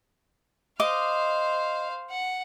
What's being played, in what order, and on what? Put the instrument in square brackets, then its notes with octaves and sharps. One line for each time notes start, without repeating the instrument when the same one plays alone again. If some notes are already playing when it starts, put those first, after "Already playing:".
[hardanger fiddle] C5 F5 [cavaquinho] D#5 D6
[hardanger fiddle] F#5